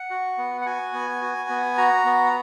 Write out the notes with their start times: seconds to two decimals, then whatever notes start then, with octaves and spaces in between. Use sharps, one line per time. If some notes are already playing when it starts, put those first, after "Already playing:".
Already playing: F#5
0.10 F#4
0.38 B3
0.61 F#5
0.66 F#4 G#5
0.94 B3
1.22 F#4
1.49 B3
1.77 F#4 A#5
2.05 B3